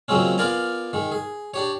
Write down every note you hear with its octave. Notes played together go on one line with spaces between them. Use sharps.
A#2 C#3 F#3 G#3 C4 C#4
B3 F4 A#4 D5 G#5 A#5
D#3 G#3
G#4
D4 G4 C#5